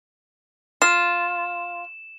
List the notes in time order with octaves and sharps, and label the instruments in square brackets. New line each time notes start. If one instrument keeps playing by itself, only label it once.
[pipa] F4 [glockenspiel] E7